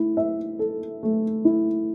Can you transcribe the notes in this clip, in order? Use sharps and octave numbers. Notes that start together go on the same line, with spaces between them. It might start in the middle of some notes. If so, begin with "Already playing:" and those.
Already playing: A3 E4
E5
A4
A3
E4